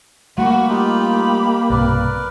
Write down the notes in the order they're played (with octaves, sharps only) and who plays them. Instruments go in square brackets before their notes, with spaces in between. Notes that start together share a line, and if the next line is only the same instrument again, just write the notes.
[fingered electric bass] G3 A3 [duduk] A#3 [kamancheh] F#4 [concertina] B5
[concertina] D#4 F4 [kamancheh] G4 B5
[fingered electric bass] B1 G2 C3 [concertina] A#4 B4 D5